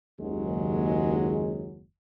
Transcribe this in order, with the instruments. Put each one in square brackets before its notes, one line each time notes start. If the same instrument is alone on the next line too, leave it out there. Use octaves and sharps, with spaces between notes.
[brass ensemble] F#1 D#2 F#3 G#3